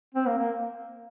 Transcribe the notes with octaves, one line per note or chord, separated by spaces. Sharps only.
C4
A#3
A#3